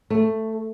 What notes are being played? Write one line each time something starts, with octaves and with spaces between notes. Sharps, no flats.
A3